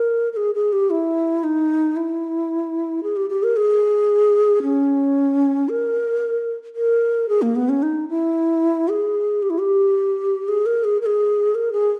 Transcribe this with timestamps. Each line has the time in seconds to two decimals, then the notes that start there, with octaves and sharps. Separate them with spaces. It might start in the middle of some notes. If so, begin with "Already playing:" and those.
Already playing: A#4
0.33 A#4
0.37 G#4
0.55 G#4
0.73 G4
0.90 E4
1.44 D#4
1.96 E4
3.03 G#4
3.16 G4
3.30 G4
3.43 A#4
3.56 G#4
4.63 C#4
5.69 A#4
6.76 A#4
7.29 G#4
7.42 A#3
7.56 B3
7.69 C#4
7.83 D#4
8.09 E4
8.89 G#4
9.42 G4
9.50 E4
9.59 G4
10.48 G#4
10.66 A#4
10.84 G#4
11.02 A#4
11.06 G#4
11.55 A#4
11.72 G#4